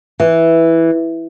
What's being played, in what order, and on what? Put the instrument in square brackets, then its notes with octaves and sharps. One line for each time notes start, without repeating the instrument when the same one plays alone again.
[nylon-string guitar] E3